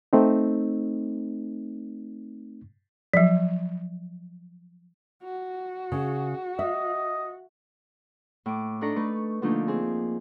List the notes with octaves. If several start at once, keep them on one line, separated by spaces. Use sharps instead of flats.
A3 C4 D#4
F3 F#3
F#4
C#3
D#5 E5
A2 D6
D4 D#4 A4 D5 A#5 C#6
A3 B4 C#6
D3 F3 A3 A#3 D4 D#4
C4 G#4